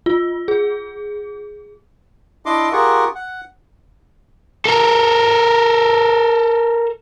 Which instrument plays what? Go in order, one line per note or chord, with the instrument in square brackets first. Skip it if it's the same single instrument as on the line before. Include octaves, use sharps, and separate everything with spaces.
[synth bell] F4
G#4
[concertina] D4 E4 D#5 C6 D6
F4 G4 G#4 A#4 F#5 C#6
F#5
[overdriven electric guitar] A4 A#4